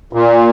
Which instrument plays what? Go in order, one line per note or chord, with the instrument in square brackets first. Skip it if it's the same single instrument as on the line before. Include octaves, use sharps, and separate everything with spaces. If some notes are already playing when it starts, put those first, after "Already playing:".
[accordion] A#2